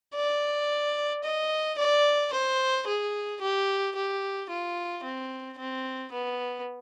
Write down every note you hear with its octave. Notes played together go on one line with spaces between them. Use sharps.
D5
D#5
D5
C5
G#4
G4
G4
F4
C4
C4
B3